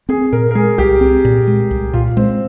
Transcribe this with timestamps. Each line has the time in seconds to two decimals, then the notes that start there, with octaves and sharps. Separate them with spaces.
0.09 C4 G#4
0.33 A#2 A#4
0.51 A#4
0.55 G#3 G#4
0.78 C2 G4
1.01 C4
1.25 A#2
1.47 G#3
1.71 C2
1.93 A#2 F4
2.17 G#3 C4